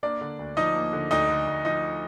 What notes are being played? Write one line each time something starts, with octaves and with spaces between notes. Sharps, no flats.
A#3 D4 D5
D3
D2
F3 D#4 D#5
A#3
D3
D2 D#4 D#5
D3
D2
F3 D#4 D#5